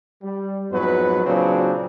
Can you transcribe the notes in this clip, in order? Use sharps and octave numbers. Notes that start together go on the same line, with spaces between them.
G3
F2 G#2 F#3 B3 B4
A#2 C#3 F#3 C4 D4